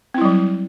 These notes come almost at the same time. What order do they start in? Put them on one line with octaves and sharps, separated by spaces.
C4 E4 G3 F#3